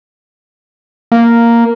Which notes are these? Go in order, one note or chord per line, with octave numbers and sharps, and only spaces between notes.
A#3